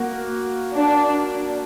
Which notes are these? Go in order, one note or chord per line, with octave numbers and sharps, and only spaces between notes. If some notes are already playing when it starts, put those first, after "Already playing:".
Already playing: A#3 F#4
D4